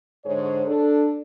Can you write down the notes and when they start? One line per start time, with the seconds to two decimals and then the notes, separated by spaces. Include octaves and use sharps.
0.24 G#2 D3 G#4 C5 C#5
0.66 D4 A4